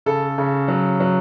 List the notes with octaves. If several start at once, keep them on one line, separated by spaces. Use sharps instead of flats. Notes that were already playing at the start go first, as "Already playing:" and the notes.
C#3 A4
C#3
F#3
F#3